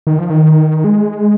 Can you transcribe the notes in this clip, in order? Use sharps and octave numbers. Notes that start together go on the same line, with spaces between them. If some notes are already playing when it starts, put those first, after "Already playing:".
D#3
F3
D#3
G#3